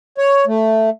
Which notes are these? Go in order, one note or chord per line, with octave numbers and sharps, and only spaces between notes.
C#5
A3